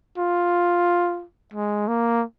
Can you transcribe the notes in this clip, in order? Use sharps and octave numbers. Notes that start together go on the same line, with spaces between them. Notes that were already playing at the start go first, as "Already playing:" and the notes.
F4
G#3
A#3